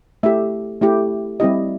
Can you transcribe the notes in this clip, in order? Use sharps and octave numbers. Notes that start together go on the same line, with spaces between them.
A3 E4 G4 E5
A3 E4 G4
G3 C4 E4 G4 D#5